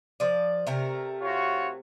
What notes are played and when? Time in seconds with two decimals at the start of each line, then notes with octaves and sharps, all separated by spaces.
0.20 F3 D5
0.67 C3 A3 A#4
1.21 F4 F#4 C#5